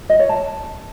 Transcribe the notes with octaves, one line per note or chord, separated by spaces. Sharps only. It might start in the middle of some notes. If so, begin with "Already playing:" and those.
D#5
C#5
A5